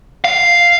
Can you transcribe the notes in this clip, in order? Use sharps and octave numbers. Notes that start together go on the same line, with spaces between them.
F5